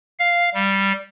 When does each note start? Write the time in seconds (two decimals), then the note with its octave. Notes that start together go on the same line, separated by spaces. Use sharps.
0.19 F5
0.54 G3